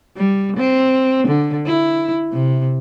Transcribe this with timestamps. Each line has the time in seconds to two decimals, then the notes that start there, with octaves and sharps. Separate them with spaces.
0.17 G3
0.57 C4
1.28 D3
1.66 E4
2.32 C3